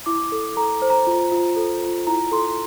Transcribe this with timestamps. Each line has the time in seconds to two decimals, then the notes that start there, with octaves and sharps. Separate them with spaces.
0.06 E4 D6
0.32 A4
0.57 A4 A#5
0.82 C5
0.90 A#5
1.07 F4
1.32 F4
1.56 A4
1.81 F4
2.07 E4 A#5
2.32 A4 C6